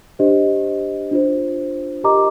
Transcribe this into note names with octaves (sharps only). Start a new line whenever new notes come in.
D4 G4 C5 D#5
D4 F4 C5
G4 A#4 D#5 A#5 D6